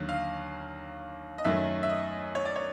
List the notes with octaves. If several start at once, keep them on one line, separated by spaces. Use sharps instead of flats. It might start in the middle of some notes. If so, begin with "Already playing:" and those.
Already playing: D#2 D3 F#3
F5
D#5
F#2 D#3 F#3 A3 E5
E5
D#5
C#5
D5
C#5